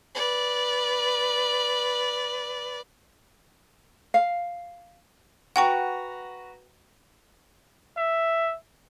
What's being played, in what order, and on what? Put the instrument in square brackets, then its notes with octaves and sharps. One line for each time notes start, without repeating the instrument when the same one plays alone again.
[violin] B4 D5
[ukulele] F5
[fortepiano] F#4 B4 A#5 [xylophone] F#5 G5 C#6
[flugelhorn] E5